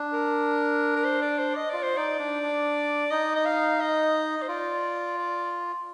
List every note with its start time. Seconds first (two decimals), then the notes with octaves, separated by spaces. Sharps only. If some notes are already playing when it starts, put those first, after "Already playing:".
Already playing: D4
0.13 A#4
0.96 A#4
1.04 C5
1.22 D5
1.39 C5
1.56 D#5
1.70 F4 D5
1.83 C5
1.96 D#4 D5
2.19 D4
2.42 D4
3.11 D#4 D#5
3.35 D#5
3.45 F5
3.80 D#5
4.42 C5
4.48 F4 D5
5.18 D5